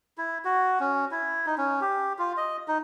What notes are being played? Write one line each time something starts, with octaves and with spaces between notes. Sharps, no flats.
E4
F#4
C#4
E4
D#4
C#4
G4
F4
D#5
D#4